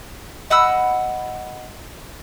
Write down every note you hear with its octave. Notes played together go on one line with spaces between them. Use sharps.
D#5 F#5 B5 E6